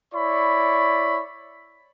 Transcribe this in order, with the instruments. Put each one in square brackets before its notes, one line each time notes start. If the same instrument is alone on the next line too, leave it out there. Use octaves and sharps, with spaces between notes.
[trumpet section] E4 C#5 D5 B5 C#6